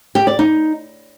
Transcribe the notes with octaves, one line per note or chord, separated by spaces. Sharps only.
G4
D5
D#4